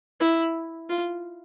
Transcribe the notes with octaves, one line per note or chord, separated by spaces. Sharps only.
E4
F4